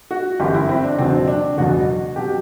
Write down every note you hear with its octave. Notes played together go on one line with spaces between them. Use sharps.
F#4
G1 F#2 E3 G4
E4
C4
D4
F#1 E2 B2 F#3 C4
D4
F#1 E2 B2 F#3 F#4
B2 F#3 G4